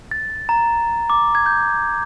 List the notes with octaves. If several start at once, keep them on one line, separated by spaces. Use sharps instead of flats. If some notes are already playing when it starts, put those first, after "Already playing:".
A6
A#5
D6
G#6
G6